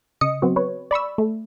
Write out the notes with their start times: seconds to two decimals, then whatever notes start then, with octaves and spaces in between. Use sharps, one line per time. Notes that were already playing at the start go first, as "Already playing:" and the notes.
0.21 C#3 D#5 D#6 C#7
0.42 F#3 B3 C4 F#4
0.56 B4 C#5
0.91 D5 B5 C#6 E6
1.18 A3